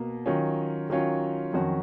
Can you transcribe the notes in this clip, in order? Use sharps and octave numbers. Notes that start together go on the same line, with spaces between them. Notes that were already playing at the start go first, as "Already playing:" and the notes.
Already playing: B2 A#3
D#3 F#3 C#4 F4
D#3 F#3 C#4 F4
F2 D#3 F#3 C#4 F#4